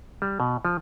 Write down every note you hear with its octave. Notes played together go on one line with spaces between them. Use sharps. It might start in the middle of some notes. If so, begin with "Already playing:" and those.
G3
B2
F3